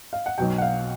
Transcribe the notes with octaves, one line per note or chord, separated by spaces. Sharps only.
F5
F#5
B1 B2 F#3 G5
F#5
F5